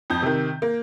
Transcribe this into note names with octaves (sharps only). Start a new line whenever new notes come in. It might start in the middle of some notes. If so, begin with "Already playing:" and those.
F2 G6
C3 D#3
A#3